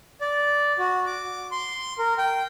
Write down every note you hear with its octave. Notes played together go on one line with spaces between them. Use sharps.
D5
F#4
D6
C6
A#4
G5